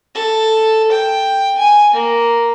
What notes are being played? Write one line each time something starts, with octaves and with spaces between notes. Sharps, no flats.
A4
G5
G#5
A#3